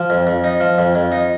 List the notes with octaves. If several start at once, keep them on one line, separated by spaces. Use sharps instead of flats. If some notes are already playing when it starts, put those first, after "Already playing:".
Already playing: F3
F2
F2
D#4
F3
F2
F2
D#4